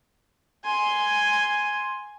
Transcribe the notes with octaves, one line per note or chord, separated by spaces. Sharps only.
G#5 C6